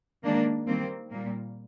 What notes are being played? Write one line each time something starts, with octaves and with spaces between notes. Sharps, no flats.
D#3 G#3 A#3 D4
D#3 G3 A#3 C4
A#2 G3 A#3